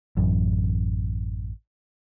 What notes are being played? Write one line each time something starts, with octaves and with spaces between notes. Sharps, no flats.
A1 F#2